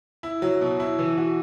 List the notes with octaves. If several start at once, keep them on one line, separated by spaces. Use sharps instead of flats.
E4
F#3
B2
E4
E3
F#4